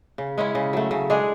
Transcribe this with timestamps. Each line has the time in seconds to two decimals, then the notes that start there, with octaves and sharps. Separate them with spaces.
0.18 C#3
0.38 G#3 C#4 E4
0.55 C#3
0.73 F#3 A3
0.91 C#3
1.10 G#3 D4 G#4